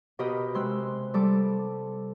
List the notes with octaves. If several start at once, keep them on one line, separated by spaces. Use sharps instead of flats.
B2 G4 A#4 B4 D#5
C3 G#3 C6 E6 F#6
G3 A4 D6